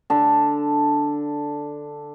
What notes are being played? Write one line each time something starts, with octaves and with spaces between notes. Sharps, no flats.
D3 A4